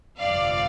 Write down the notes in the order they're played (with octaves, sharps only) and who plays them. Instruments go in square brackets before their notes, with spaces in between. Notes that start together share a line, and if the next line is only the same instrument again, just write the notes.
[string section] G1 F2 C3 D5 F5